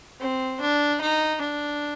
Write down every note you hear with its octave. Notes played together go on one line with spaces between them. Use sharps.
C4
D4
D#4
D4